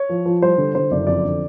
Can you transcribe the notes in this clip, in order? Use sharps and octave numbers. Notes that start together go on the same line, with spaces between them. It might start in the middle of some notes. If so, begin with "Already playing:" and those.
Already playing: C#5
F3
F3
G3 C5
D3
D3 C5
F#1 D5
F2 D5
D3